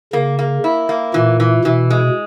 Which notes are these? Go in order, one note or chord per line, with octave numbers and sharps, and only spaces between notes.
C#3 A#3
A#3
E4
A#3
A#2 E3
E3
B2 E3
G#3